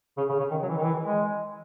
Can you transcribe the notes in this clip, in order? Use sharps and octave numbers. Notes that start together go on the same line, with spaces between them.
C#3
C#3
C#3
D#3
F#3
E3
D#3
E3
G#3